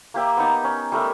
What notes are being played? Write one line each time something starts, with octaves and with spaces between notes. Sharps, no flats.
A#3 G4 E5
B3 D#4
C#4
G3 A3 A#4 E5